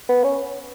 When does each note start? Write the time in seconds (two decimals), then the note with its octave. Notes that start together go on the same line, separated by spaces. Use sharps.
0.09 B3
0.24 C#4